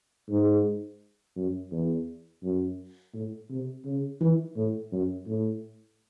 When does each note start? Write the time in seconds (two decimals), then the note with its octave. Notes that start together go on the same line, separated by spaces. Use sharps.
0.30 G#2
1.36 F#2
1.71 E2
2.43 F#2
3.14 A2
3.50 C3
3.85 C#3
4.21 E3
4.56 A2
4.92 F#2
5.27 A2